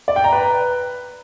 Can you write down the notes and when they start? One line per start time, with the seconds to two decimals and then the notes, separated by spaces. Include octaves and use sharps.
0.08 D5
0.16 G5
0.24 A#5
0.32 B4